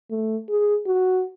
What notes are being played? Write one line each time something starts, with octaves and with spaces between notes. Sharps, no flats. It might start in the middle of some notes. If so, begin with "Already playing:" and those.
A3
G#4
F#4